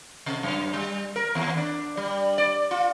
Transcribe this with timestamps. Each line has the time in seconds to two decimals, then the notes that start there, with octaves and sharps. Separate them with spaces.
0.26 C3
0.43 F#2
0.74 G3
1.16 A#4
1.35 D#2
1.57 D4
1.97 G3
2.38 D5
2.71 F4